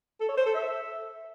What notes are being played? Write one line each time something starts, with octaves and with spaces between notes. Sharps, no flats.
A4
C#5
C5
A4
E5